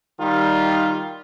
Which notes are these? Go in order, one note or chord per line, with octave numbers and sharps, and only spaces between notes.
D#3 G3 D#4 F4